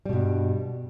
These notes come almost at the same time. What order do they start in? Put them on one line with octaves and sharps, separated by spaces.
G3 B2 G2